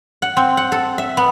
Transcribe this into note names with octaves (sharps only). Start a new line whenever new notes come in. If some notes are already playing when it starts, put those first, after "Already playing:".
F#5
C4
F#5
A4
E5
B3